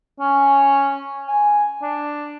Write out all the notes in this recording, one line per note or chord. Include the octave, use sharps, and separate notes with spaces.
C#4
G#5
D4